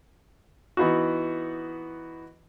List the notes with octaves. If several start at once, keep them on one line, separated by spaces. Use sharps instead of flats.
E3 B3 D#4 F#4